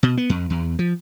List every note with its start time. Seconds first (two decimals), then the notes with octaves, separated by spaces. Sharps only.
0.03 B2
0.17 B3
0.29 F2
0.50 E2
0.79 F3